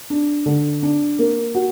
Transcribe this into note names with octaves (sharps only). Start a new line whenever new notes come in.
D4
D3
D4
A#3
F#4